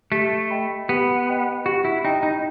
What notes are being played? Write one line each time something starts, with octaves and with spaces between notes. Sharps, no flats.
A3 G4
D#5 G5 B5
B3 G4
D#5 G5 B5
F#4 G4
E4
D#4 D#5 G5 B5
D#4